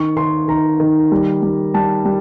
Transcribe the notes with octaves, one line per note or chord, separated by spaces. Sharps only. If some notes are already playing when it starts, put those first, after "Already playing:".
Already playing: D#3 C#6
D#3 C6
D#3 A#5
D#3
G3
G3
G3 A5
G3